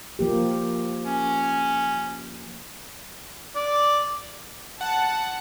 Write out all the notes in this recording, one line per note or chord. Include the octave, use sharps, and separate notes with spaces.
F3 A#3 G4
C#4
D5
F#5 A5